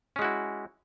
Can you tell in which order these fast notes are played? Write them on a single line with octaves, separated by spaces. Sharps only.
C#4 G#3 F#4 E4